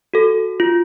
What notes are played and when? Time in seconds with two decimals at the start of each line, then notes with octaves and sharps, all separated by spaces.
0.14 F#4 A4
0.60 F4